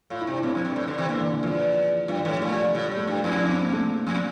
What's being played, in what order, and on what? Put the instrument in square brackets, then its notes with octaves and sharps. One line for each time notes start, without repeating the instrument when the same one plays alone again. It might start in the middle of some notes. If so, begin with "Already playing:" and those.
[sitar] A2 [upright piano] F4
[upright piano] E4
[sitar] C3 [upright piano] D4
[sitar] A2 [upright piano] C4
[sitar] F2
G2
A2
D3
C3 E3
[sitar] D3 [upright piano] A#3
[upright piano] E3
D3
[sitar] E2 [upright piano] F3
[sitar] G2 [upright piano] F3
[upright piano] E3
[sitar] A2
[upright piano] F3
[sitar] A#2 [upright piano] A3
[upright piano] G3
F3
[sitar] A2 [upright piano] F3
[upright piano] G3
[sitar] A2
[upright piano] A3
[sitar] G2
[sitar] F2 [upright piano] E4
[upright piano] D4
C4
A#3
A3
[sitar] F2